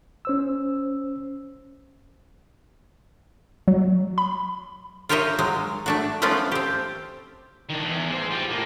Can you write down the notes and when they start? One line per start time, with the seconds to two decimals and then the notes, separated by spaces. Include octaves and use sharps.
0.25 C#4 C5 E6
3.68 F#3
4.18 B5
5.09 F4 G4 A#4 C#5 D#5 E5
5.39 F#3 G#3
5.86 A3 D4 F#4
6.22 F3 A3 B3 C#4 F4 D5
6.52 C4 G4
7.70 D#3 D4
7.84 E2
8.10 G#3 C5
8.31 F4 G4
8.50 A2 A#3